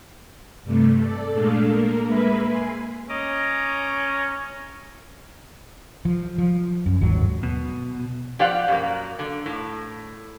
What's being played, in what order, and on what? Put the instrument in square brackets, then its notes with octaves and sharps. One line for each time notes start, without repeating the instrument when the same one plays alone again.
[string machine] G2 C3 A3
A4 D5
A#2 G#3 A3 D4 A4 F5
A#3 A#4
G#3 A#3 B4 E5 B5
G#5 C6
[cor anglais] C#4 [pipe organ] D#5 A#5 D6
[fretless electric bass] F3
F3
F#2
G1 D#2 G#2 F#3
[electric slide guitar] B2
[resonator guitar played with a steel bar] F3 G4 C5 D5 F5 F#5
F#2 A#3
D3
A2